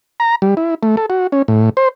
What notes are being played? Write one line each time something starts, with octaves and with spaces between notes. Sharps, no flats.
A#5
G3
E4
A3
A4
F#4
C#4
A2
C5